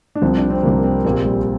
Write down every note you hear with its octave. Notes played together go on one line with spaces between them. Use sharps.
D4
C2 C3 F3 C4
D4
C4
C2 C3 F3 A#3
C4
A#1 A#2 A#3 C4 G4
G3